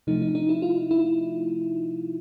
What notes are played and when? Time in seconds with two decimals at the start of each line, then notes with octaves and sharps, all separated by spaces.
0.07 C3 F3 A3 D#4
0.22 D#4
0.35 D#4
0.49 E4
0.62 F4
0.91 E4